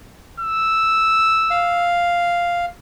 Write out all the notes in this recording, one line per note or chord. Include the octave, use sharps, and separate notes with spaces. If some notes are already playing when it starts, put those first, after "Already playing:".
E6
F5